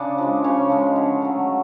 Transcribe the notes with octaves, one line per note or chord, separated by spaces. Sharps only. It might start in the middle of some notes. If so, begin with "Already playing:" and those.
Already playing: C#3 D4 D5
F3 G#3
C#3 C#4 C#5
F3 G#3
D3
F#3 A3